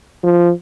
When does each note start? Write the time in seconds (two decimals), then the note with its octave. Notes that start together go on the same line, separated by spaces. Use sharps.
0.23 F3